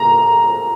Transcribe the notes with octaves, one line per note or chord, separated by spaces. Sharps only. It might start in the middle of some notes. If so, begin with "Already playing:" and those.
Already playing: A#5